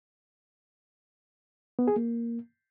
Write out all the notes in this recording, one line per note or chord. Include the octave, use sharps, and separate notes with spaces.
B3
G#4
A#3